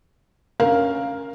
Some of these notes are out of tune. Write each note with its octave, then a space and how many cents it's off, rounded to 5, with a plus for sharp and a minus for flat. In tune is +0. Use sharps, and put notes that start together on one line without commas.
C#4 +0 A#4 +5 F5 +0